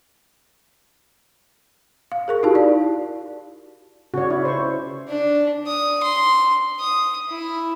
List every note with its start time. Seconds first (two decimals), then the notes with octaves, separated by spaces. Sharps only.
2.12 F5
2.28 G#4 A#4 C#6
2.43 D#4 E4 F#4 G4 F5 A5
2.55 D5
4.14 C#3 F#4 C#5 D5
4.30 E4
4.45 C5 C#6
5.08 D4
5.67 D#6
6.03 C6
6.80 D#6
7.29 E4